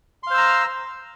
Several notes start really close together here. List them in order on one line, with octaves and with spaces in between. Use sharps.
C6 F5 C5 E6 A#5